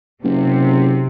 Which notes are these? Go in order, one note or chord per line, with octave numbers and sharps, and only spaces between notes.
F#1 C3